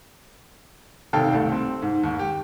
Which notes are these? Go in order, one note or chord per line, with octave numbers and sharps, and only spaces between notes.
G#1 C3 A4 F5 G5
C2 A3
C4
G#2
D#2 G#2
G4